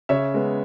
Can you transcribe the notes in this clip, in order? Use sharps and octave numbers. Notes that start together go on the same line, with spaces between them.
C#3 C#5 E5
G#3 B3